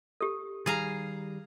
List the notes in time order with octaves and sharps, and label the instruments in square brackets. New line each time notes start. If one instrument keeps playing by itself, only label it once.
[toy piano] G4 A4
[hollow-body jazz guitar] D#3 G3 [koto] G#4 F5 A#5